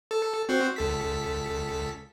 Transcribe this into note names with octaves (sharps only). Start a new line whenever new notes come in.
A4
C4 F#4 C5
C#2 A4 B6